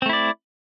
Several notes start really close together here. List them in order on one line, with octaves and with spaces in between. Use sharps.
C4 A3 E4 D5